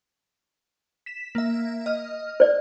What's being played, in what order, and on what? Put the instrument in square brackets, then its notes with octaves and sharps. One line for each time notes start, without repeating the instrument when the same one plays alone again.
[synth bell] B6 E7
A#3 E5
D#5 F6
[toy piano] C5 D5